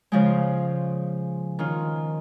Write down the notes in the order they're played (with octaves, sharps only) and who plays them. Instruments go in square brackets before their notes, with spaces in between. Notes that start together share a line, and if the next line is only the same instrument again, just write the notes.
[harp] C#3 F3 G#3
D#3 C#4 F4